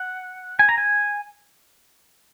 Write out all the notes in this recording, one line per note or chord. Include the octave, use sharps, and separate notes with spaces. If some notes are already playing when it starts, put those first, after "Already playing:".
Already playing: F#5
G#5
A#5
G#5